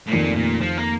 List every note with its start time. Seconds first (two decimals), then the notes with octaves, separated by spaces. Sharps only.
0.07 A2
0.12 F1 F2 A#2 D#3 A3
0.36 A#2
0.61 F3
0.77 A#3